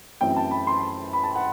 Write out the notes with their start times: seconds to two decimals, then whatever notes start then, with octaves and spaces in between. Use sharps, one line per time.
0.21 F#2 E3 A3 C4 G5
0.36 A5
0.51 B5
0.67 C6
1.13 B5
1.23 A5
1.36 F#5